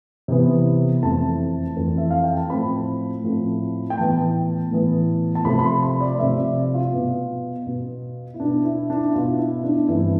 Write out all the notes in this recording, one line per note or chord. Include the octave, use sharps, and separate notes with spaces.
C3 E3 B3
F2 E3 A3 C4 A5
F2 E3 A3 C4
E5
F5
G5
A5
A2 F3 A3 C4 B5
A2 F3 A3 C4
G5
A2 E3 B3 A5
A2 E3 B3
A5
C3 F3 A3 C4 B5
B5
C6
B5
D5
C3 F3 A3 C4 E5
D5
F4
B2 B3
B2 B3
E4
B2 B3 D4
E4
D4
E4
B2 B3 F4
E4
D4
G2 E3 A3 C4 E4